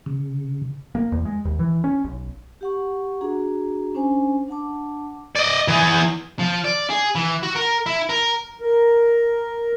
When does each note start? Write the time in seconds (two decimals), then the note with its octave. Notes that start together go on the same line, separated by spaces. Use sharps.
0.06 C#3
0.95 A#3
1.12 E2
1.25 G#3
1.45 D#2
1.59 E3
1.84 C#4
2.04 B1
2.61 G4 F#5 C#6
3.21 D4 F#4 G#4 A#5
3.94 C#4 D4 C5 G#5
4.48 D4 F#5 A5 D6
5.35 D5 D#5
5.68 E3 G#4
6.39 F3
6.64 D5
6.90 G#4
7.15 E3
7.43 F#4
7.56 A#4
7.86 E4
8.09 A#4
8.61 A#4